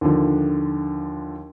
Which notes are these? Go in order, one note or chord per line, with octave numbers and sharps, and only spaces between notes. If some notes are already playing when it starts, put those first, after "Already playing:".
D#2 D3 F3